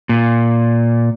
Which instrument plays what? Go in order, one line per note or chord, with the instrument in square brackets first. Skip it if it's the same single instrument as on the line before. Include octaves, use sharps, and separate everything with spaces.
[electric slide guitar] A#2